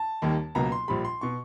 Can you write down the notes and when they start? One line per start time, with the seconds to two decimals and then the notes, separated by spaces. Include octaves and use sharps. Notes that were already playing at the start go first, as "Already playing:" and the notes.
Already playing: A5
0.22 D#2 D#3 G3 A#3
0.55 C#2 B2 F#3 A#3 A#5
0.72 C6
0.88 A#1 A#2 G3 B5
1.05 C6
1.21 B2 C#6